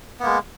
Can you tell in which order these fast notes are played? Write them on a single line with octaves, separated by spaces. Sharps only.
B3 A#3 G#3